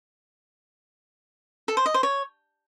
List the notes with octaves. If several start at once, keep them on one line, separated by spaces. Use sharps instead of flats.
A4
C5
D#5
C5
C#5